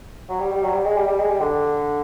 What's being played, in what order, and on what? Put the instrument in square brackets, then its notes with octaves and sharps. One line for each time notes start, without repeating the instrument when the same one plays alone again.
[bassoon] F#3
G3
G3
F#3
G3
G#3
G3
G3
G#3
G3
D3